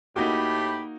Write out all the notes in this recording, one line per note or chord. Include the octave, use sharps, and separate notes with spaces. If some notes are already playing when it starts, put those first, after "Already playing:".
A2 A#3 D#4 F#4 G4 B5